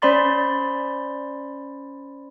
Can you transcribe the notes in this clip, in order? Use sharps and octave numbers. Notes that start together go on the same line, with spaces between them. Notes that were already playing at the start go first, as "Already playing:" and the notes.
C#4 C5 D5 B5 C6 A6